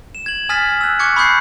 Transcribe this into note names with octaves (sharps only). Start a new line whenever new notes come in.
E7
G#6 F#7
G#5 D#6 F6 G#6 A6 B6
E6 F#6
C#6 D6 F#6 G#6 C#7
B5 C#6 D#6 F#6 G6 C7